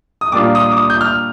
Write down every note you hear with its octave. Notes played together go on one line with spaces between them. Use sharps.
D#6
A#2 G3 D4 F4 D6
D#6
D6
D#6
G6
F6